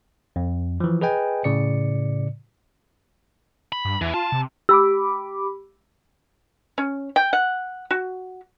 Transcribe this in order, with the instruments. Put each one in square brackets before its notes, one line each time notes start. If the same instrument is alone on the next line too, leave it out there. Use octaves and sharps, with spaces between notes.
[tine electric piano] F2
E3 F3
G#4 B4 D#5 G5 G#5
A2 C#3 D5 C#7
[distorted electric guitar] B5
[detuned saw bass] G2
[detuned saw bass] E2 [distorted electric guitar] E3
[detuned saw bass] F4 [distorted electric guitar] A5
[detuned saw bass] C3
[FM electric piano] G4 B5 D6 [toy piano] E6
[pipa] C#4
G5
F#5
F#4